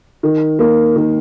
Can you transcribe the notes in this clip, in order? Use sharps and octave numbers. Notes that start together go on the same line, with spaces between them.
D#3
A#3
D#3